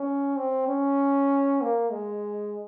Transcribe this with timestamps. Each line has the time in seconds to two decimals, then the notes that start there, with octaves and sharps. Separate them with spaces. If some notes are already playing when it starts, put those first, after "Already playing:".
Already playing: C#4
0.36 C4
0.68 C#4
1.61 A#3
1.91 G#3